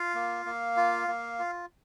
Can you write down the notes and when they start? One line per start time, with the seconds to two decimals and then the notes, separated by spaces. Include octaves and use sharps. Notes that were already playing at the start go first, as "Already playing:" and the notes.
Already playing: F4 F5
0.15 A#3
0.46 A#3
0.77 F4
1.08 A#3
1.39 F4